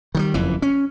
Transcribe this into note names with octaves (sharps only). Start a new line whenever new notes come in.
D#3 F3 G3
F#1 F2 E3
C#4